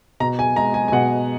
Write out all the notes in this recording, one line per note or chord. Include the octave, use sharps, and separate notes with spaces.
B2 A#5
G#5
G#3 A#5
G#5
G#5
B2 F#5